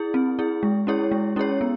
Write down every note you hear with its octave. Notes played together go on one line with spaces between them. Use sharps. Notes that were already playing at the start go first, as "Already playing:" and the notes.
Already playing: E4 G#4
C4
E4 G#4
G#3
C#4 E4 G#4 C#5
G#3
C#4 E4 G#4 C#5
B3